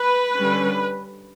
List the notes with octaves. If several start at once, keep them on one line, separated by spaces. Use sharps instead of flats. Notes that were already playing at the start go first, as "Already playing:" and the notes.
Already playing: B4
D3 G3 C#4